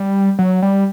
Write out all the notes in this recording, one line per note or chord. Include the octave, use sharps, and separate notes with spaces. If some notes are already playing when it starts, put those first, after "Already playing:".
Already playing: G3
F#3
G3